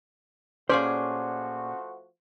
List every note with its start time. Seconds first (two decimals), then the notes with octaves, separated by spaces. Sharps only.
0.69 A#2 F3 A3 C#4 F#4 G#4 C5 D5